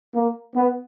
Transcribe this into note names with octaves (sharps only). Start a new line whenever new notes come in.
A#3
B3